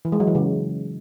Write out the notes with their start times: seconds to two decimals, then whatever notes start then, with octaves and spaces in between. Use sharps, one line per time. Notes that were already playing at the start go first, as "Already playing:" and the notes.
0.05 E3
0.12 G#3
0.20 F#3
0.27 E3
0.35 C#3